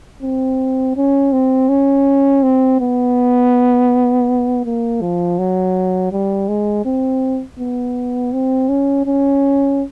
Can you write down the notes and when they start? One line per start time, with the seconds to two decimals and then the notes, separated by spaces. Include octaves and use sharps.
0.23 C4
0.97 C#4
1.33 C4
1.69 C#4
2.43 C4
2.81 B3
4.65 A#3
5.01 F3
5.38 F#3
6.12 G3
6.48 G#3
6.85 C4
7.59 B3
8.33 C4
8.69 C#4
9.06 C#4